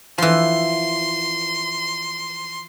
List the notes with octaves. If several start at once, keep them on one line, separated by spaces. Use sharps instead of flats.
E3 F3 C6